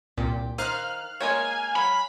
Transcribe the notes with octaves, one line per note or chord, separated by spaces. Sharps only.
C2 A#2 G4
D#3 D#4 C5 F5 F6 F#6
G#3 A#3 C#5 G#5
F#3 B5